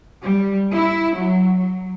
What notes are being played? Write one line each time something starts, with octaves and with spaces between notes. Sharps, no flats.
G3
E4
F#3
F#3